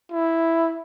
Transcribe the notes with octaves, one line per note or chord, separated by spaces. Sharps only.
E4